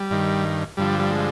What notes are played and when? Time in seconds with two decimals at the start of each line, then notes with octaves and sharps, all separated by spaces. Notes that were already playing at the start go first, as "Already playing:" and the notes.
Already playing: G3
0.11 G2 D#3
0.77 G2 D3 F3 G3
1.00 G3
1.11 G#3